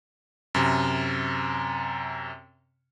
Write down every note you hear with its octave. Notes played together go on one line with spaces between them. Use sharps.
F#2 C3